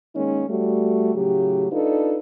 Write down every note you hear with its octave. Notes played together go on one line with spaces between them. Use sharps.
D#3 G#3 A#3 C#4 D#4
G3 A3 F#4
A2 C#3 F#3 G4
D4 D#4 F4 A4 B4